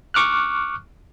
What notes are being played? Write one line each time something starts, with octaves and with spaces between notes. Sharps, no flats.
C#6 D6 F6 F#6